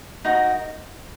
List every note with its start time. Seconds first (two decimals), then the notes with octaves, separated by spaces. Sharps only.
0.25 D#4 F#4 A#4 D#5